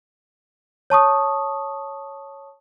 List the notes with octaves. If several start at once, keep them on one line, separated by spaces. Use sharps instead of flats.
C#5 A5 C#6 D#6